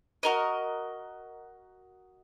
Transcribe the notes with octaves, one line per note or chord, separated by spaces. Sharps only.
F#4 A#4 D#5